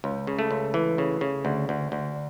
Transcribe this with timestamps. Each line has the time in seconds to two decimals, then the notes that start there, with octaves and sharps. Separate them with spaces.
0.04 C#2
0.27 C#3
0.39 A3
0.51 C#2
0.74 E3
0.98 C#3
1.21 C#3
1.45 D2
1.69 D2
1.92 D2